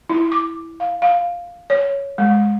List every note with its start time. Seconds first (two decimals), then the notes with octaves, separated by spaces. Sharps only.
0.10 E4
0.32 D6
0.80 F5
1.02 F5
1.70 C#5
2.18 G#3